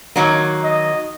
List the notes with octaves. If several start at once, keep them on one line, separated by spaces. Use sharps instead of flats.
D#3 F#3 A#3
D#5